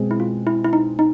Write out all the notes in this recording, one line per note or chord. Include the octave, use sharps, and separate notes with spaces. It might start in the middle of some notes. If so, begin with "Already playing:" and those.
Already playing: B2 G#3 C4
E4
F4
E4
E4
D#4
D#4